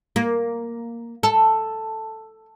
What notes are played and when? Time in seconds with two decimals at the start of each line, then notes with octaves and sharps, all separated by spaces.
0.16 A#3
1.23 A4